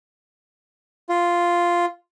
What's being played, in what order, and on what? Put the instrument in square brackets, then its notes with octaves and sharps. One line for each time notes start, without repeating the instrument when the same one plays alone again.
[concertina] F4